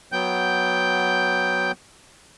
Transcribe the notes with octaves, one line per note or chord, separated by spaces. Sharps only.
F#3 B3 G5 G6